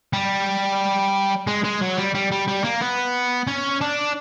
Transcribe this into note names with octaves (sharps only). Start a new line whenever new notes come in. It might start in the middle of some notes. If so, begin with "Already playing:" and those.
G3
G#3
G#3
F#3
G3
G3
G3
G3
A#3
B3
C#4
D4